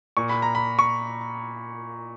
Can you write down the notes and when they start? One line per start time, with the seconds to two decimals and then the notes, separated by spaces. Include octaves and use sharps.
0.17 A#2 C#6
0.29 B5
0.42 A#5
0.55 B5
0.79 C#6